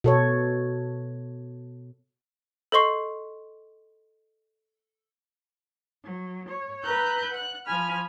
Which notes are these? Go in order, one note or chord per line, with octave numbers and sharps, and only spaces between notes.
B2 A4 C#5
A4 C5 D#5 C6 C#6 C7
F#3
C#5
B4 A#5 E6 F#6 G6
F#5 F#6
F3 G#5 B5 F6